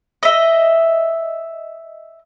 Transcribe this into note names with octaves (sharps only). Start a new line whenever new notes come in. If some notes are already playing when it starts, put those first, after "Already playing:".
D#5 E5